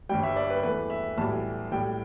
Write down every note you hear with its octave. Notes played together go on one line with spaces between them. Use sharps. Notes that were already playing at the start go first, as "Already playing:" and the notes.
G1 G2 G3 G5
E5
D5
B4
E2 E3 A3 B4
E5
B1 A2 E3 G3 A5
B1 A2 G3 G5